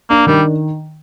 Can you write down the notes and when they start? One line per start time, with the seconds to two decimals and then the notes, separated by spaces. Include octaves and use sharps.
0.10 A#3 D4
0.27 D#3 G3